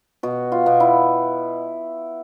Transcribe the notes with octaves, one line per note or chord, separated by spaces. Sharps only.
B2 F#4
F4
B2
E4